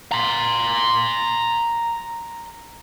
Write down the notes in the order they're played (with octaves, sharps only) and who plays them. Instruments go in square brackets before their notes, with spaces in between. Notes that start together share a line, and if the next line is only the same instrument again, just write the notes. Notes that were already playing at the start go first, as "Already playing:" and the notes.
[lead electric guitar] A#5 C6